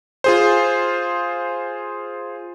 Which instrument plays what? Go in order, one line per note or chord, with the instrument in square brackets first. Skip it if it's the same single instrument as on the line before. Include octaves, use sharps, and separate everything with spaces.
[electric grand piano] F4 G#4 C5